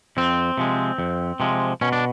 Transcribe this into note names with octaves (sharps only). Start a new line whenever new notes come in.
F2 C4
C3 F3 G#3
F2
C3 F3 G#3
B2 C#4
D4